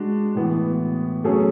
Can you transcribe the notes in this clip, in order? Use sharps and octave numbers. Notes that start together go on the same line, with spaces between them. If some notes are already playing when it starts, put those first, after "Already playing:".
Already playing: G#3 D4 F#4
A2 E3 B3
F#3 A3 C#4 G#4